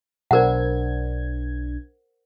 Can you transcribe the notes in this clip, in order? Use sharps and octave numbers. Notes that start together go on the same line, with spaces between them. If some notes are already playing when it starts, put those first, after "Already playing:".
B1 D4 A#4 C5 F#5 G#6